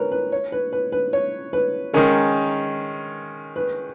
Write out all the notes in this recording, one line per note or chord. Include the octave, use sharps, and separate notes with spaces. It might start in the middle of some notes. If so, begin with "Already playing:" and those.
Already playing: B3 C#4 A#4 B4
B4
C#5
B4
B4
B4
C#5
B4
D#3 G#3 C#4 A#4
B4